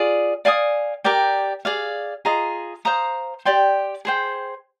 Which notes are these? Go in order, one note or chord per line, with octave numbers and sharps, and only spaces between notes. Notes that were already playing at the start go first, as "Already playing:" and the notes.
Already playing: F4 G#4 D5
D5 F5 G#5 D#6
G4 A#4 D5 G5
G#4 D5 F5
F4 G#4 D#5 A#5
C5 F5 A#5 D#6
G4 D5 G5 C6
G#4 C5 G5